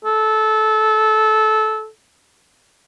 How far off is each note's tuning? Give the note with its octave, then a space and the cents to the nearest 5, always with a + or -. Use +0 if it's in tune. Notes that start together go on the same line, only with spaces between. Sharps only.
A4 -20